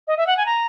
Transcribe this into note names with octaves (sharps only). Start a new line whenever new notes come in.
D#5
E5
F#5
G#5
A#5